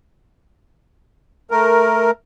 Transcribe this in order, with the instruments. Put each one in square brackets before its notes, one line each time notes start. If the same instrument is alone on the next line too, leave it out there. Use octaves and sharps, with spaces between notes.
[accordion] A3 A#4